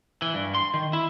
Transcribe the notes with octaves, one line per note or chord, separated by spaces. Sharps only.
E3
G2
C6
D#3
E4